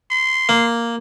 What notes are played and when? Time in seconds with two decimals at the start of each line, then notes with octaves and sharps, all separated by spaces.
0.11 C6
0.49 A#3